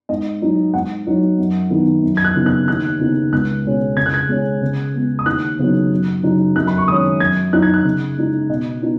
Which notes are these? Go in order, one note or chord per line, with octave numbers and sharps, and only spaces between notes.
G#2 D#5
F#3 D#4
G#2 F#5
F#3 D#4
F#2
D#3 B3 D#4
F#2
G#6
F#6
C#3 B3 D#4
F#6
D#2 F#6
C#3 B3 D#4
C#2 F#6
B2 G#3 C#4
C#3 G#6
F#6
G#6
G#3 C#4
C#3
G#3 B3
D#6
D#2 F#6
C#3 F#3 B3 D#4
F#2
C#3 F#3 D#4
F#2 F#6
B5
C#6
D#3 G#3 C#4 D#6
F#2 G#6
F#3 D#4 F#6
G#6
F#6
C#3
G#3 D#4
B2 D#5
B3 D#4